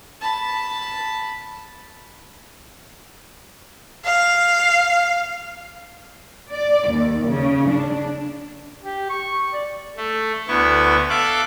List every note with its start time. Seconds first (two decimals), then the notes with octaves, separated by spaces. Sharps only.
0.21 A5 B5
4.06 F5
6.50 D5
6.89 D#2
7.28 C#3
7.69 D4
8.81 G4
9.09 C#6
9.53 D5
9.97 A3
10.48 D2 B3 E4 C#6
11.10 A4 E5 F5 D6 F#6